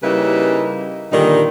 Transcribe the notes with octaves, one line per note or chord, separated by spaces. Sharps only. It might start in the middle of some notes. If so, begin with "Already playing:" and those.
C#3 G3 A#3 D#4 E4 B4
A#2 D3 D#3 G3 D#4